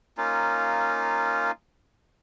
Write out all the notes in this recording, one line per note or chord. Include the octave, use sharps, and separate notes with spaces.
A#3 C#4 D#4 F4